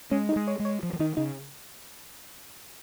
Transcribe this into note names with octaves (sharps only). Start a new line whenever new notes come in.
G#3 C#4
D#4
G#3
C#5
G#3
C#5
F3
F3
D#3 D#4
C#3 D#4